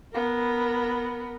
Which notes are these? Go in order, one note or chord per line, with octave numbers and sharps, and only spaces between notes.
B3 A#4